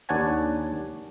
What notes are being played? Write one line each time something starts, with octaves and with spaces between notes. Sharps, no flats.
D#2 D4 C#5 F#5 G#5 A5